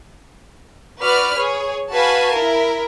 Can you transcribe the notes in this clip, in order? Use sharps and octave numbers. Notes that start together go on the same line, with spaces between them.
F#4 B4 D5 F6
G#4 C#5
F#4 B4 F5 G#5 A5
E4 A#4